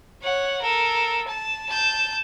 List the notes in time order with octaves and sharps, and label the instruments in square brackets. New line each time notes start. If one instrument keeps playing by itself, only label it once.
[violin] C#5 F#5
A4 A#4
A5
A5 G6